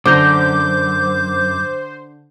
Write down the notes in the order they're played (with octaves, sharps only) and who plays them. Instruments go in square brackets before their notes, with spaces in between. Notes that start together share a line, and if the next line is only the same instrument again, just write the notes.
[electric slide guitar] F#2 [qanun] D3 A#5 [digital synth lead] C5 [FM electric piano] D6 G6